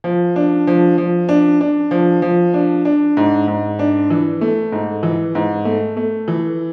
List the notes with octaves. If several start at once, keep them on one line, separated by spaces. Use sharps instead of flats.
F3
D4
F3
F3
D4
D4
F3
F3
D4
D4
G#2
G#2
D4
E3
A3
G#2
E3
G#2
A3
A3
E3